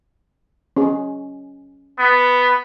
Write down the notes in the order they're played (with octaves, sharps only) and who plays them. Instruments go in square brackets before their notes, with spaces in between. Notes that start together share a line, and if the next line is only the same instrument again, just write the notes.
[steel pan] C#4 G#4
[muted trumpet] B3